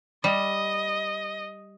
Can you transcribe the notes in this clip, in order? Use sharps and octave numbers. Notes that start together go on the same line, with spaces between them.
G3 D#5